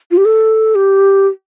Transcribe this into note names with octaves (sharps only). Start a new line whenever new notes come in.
F4
G4
A4
G4